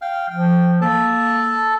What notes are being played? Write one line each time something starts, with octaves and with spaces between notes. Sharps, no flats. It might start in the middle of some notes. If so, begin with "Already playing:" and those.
F5 G5 F6
F3 G5
A#3 A4 A5